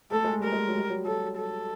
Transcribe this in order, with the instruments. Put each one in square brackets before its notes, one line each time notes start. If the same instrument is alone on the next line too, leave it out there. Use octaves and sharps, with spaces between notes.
[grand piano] A3 [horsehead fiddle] A4
[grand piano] G#3
[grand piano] G3 [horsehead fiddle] A#4
[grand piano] G#3
F#3
G3
F#3
[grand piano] F#3 [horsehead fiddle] A4
[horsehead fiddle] A4